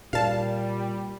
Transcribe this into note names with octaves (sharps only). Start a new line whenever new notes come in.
A#2 G3 F5 A5